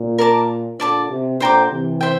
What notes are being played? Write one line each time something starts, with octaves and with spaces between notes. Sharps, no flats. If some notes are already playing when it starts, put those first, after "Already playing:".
Already playing: A#2
A#4 D5 A5 D6
A#2 D3 D5 A5 D6
C3
A#2 D3 C5 G5 A#5 D6
C3 E3
C5 E5 G5